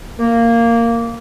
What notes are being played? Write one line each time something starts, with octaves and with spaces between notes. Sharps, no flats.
A#3